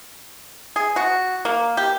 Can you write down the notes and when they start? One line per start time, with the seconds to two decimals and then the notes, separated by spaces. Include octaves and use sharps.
0.76 G#4
0.96 F#4
1.45 A#3
1.77 G4